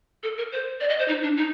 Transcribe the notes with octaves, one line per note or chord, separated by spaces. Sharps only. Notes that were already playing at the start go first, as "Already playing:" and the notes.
A4
A#4
C5
D5
D#5
C5
D#4
D4
D#4